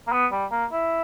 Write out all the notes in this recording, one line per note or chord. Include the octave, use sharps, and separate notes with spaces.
A#3
B3
G3
A#3
E4